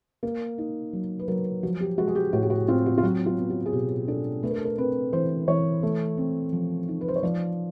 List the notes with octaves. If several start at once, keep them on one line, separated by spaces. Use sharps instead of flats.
A#3
D#4
F#3
B4
F#3 A#4
F3 F#4
G4
G#3 F#4
G#4
G4
A2 F#4
G4
F#4
C4 F4
F#4
F4
F#3 F#4
F4
B3
F#4
G#4
B2 G4
D4 A4
A3 B4
A#4
A4
A#4
C4 B4
E3 C5
E3 C#5
A3
C4
F3
D#4
B4
C5
C#5
F3 D5